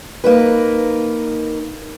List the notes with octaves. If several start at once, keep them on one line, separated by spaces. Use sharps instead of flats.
A#3 D#4 B4